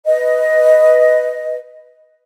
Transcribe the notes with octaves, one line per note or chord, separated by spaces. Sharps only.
B4 D#5